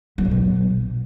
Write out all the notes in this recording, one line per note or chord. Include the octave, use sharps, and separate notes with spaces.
F#3
A2
B2